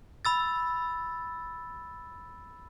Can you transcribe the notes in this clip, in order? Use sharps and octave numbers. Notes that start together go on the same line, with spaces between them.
B5 E6 A6